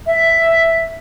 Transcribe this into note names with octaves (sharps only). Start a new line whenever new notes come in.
E5